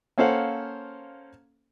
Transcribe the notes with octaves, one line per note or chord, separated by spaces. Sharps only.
A#3 C#4 A4 C5 F5 F#5